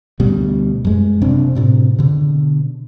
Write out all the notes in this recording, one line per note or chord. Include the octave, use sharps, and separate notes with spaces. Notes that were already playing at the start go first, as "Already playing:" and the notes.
D2 B2 G3
F#2 G#3
F#1 C3 C4 D4
A2 C3 C4
B2 D3